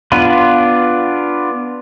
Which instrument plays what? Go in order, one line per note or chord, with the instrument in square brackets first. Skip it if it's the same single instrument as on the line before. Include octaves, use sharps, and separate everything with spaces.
[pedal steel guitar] B3 D4 F4 B4